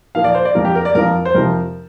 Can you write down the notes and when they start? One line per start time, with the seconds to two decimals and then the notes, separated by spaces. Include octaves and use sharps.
0.15 A#2 F3 A#3 F5
0.24 D5
0.35 C5
0.45 D5
0.55 F2 F3 A#3 A#4
0.65 G4
0.75 A#4
0.85 D5
0.95 F2 F3 A#3 A#4
1.25 C5
1.35 F2 C3 F3 A#4